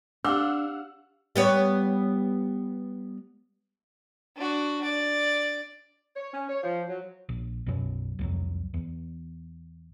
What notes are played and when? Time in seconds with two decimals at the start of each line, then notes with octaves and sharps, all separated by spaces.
0.24 D4 G4 F5 F#5 D6 E6
1.36 G3 B3 C#5
4.36 D4 F#4
4.84 D5
6.16 C#5
6.33 C#4
6.49 C#5
6.63 F3
6.88 F#3
7.29 A#1
7.66 B1 F#2 B2 F#3
8.19 C2 F2 F#3
8.74 E2